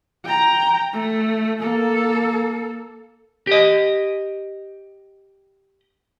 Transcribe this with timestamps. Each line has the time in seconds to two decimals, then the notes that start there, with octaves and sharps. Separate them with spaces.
0.25 G5 A#5
0.93 A3
1.59 A#3 A4
3.47 G4 D#5